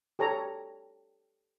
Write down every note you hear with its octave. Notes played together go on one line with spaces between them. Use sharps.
G4 A4 C#5 A#5